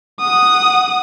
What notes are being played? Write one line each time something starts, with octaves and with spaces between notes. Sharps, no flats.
F#5 D#6